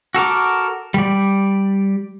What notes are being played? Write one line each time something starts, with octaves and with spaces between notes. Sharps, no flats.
F#4 A4 A#4 D6
G3 D5